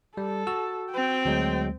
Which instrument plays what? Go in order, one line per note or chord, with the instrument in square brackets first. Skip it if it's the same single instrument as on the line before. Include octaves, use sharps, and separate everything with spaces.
[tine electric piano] G3 [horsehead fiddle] A4
[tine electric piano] F#4 E6
[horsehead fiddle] C4 G5
[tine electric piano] D2 F#3 G#3